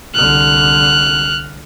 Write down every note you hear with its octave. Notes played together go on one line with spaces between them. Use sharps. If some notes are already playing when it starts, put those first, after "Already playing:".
C2 D3 F6 F#6